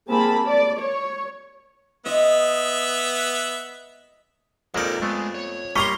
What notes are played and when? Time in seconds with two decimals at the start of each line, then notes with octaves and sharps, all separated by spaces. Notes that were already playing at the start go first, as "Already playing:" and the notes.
0.11 A#3 C4 G#4 A5 B5
0.47 D5
0.80 C#5
2.06 B3 D#5 E5
4.75 F2 G#3 A#3 D#4 A4 A#4 D5
5.02 G#3 A3 B3
5.35 C#5
5.76 G3 A#3 D#5 A#5 C6 C#6 B6